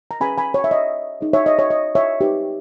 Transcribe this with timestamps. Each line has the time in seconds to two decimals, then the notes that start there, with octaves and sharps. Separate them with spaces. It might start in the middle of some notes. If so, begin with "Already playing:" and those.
0.11 A#5
0.20 C#4 G#4 B4 G#5 B5
0.38 G#5 B5
0.54 C#5
0.64 E5
0.71 D#5
1.21 D#4 G#4 C#5
1.33 C#5 E5
1.46 D#5
1.59 C#5
1.70 D#5
1.95 C#5 E5
2.21 D#4 G4 B4